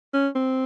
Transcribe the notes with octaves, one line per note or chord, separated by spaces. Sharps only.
C#4
C4